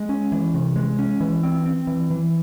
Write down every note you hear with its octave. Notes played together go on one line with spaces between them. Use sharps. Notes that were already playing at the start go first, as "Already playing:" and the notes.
Already playing: G#3
C#4
E3
C3
G#3
C#4
E3
C4
C4
E3
E3